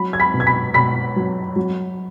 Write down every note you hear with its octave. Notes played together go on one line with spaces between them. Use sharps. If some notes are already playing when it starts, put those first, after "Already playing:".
Already playing: F#3 B5
G#6
B5 B6
B2
G#6
B5 B6
B2 B5 B6
F#3
F#3